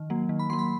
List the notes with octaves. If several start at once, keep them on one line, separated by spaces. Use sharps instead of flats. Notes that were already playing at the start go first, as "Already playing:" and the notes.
Already playing: D#3
F#3 A#3
D#3
B5
F#3 A#3 C6
B5